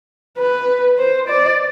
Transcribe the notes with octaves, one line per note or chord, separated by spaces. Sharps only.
B4
C5
D5